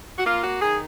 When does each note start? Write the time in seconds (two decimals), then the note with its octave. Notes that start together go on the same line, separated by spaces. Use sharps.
0.18 F#4
0.25 A#3 F4
0.43 F#4
0.61 D#3 G#4